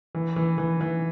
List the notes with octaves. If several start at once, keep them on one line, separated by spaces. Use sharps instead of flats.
E3
E3
E3
E3